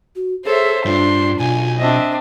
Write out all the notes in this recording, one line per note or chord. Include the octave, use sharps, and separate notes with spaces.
F#4
G#4 A4 C5 C#5 E5
G2 D4 F4 C6
B1 G#5
C4 D4 D#5 E5